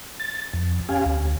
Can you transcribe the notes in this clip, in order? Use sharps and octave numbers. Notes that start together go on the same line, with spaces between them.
A6
F2
C#4 G4 F5 G#5
D2